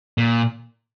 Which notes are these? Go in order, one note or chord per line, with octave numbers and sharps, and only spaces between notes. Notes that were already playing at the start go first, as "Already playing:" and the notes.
A#2